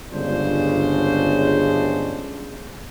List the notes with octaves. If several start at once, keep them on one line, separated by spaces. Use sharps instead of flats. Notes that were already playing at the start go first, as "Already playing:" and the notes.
G1 C#2 C#3 G#3 D4 C5